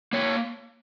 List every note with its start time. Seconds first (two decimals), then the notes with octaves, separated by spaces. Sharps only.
0.13 A#3 C#5